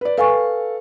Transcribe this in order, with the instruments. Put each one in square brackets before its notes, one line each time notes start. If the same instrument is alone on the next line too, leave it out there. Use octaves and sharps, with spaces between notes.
[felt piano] B4 D5
[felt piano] A4 F5 [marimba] B4 G#5 C#6